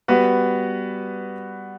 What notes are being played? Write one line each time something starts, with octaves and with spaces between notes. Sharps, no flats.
G3 B3 F#4 B4